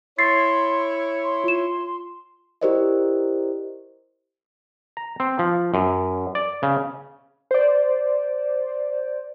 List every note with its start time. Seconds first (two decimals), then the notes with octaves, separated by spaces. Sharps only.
0.18 E4 C#5 C6 A6 C7
1.24 C6
1.44 F4 E7
2.61 E4 G4 A#4 C5 D5 D#5
4.97 A#5
5.20 C4
5.39 F3
5.74 F#2
6.35 D5
6.63 C#3
7.51 C5 D5